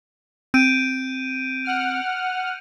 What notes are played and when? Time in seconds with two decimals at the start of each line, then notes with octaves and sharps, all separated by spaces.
0.54 C4 G6 D7 D#7
1.64 F#5 F6